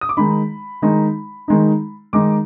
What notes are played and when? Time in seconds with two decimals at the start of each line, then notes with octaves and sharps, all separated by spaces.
0.01 D#6
0.09 D6
0.17 D#3 G#3 D#4 B5
0.82 D#3 G#3 D#4
1.48 D#3 G#3 D#4
2.13 D#3 G#3 D#4 D6